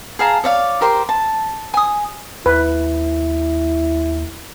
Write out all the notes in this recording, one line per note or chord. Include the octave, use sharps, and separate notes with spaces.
G#4 F5 A5 A#5
C#5 D5 F5
G4 A#4 C5 C6
A5
G#5 D#6
D#2 E4 B4